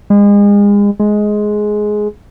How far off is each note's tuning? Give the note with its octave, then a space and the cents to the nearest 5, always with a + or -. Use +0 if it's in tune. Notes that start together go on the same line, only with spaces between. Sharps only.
G#3 -35
G#3 +10